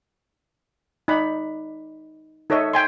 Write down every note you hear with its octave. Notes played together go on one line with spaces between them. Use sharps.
D#4 D5 B5
D#4 A4 C#5 D#5 E5
G5 G#5 C6